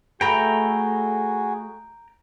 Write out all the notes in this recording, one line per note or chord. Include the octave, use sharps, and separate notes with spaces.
A3 F#4 G#4 B4 G5 A#5